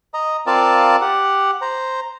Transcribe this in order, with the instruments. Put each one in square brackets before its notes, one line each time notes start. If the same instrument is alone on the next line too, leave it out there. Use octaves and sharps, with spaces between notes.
[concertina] D#5 A#5
C4 F4 A#4 D5 F5 A5
G4 F#5
C5 A#5